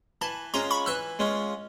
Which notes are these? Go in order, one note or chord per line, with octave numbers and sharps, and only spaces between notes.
E3 A5 B5
G#3 C#4 F4 A#5 C6
B5 C#6
E3 E6 F#6
G#3 C#4 F4